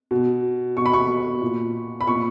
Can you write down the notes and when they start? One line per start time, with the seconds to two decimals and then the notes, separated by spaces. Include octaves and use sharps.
0.11 B2
0.77 B2 C#6
0.86 B5
0.93 C#6
1.41 A#2
2.01 B5
2.07 A#2 C#6